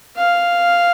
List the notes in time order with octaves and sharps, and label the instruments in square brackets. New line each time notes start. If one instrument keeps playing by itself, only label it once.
[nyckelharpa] F5